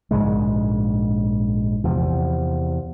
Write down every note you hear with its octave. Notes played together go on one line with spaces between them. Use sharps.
A#1 G#2 C#3 G#3
E2 C3 F3